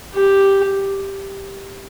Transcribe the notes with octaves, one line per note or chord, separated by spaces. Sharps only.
G4